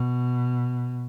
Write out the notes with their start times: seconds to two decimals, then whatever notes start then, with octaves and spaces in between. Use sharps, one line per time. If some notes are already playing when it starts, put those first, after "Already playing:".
Already playing: B2